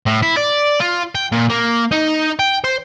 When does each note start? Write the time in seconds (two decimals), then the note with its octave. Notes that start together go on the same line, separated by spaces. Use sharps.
0.06 A2
0.23 E4
0.37 D5
0.80 F4
1.15 G5
1.32 A#2
1.50 A#3
1.91 D#4
2.39 G5
2.64 C5